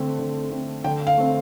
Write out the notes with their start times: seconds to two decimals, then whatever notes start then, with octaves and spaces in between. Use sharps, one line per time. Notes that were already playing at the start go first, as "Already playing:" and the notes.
Already playing: D3 A3 C4
0.19 D3
0.51 A3 C4
0.84 D3 G5
1.07 F5
1.18 A3 C4